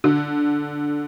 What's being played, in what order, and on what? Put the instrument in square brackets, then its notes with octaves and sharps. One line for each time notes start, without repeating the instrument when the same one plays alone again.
[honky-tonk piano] D3